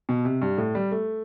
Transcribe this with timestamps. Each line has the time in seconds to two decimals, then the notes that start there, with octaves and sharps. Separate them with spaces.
0.09 B2
0.25 C3
0.42 G2
0.58 A2
0.75 G3
0.92 A3